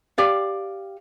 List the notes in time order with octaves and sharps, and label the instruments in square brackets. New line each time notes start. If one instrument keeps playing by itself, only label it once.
[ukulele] G4 D5 F5